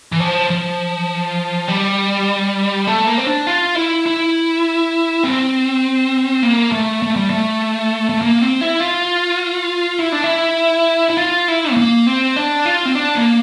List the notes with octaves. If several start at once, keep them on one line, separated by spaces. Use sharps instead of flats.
E3
F3
F3
G3
A3
A#3
C4
D4
F4
E4
E4
C4
A#3
A3
A3
G3
A3
A3
A#3
C4
E4
F4
E4
D4
E4
E4
F4
E4
A3
A#3
C4
D4
F4
C4
D4
A#3